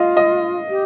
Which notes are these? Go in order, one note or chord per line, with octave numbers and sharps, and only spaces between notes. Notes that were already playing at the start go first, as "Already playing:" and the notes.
Already playing: F4 D#5 F5
D#5
G4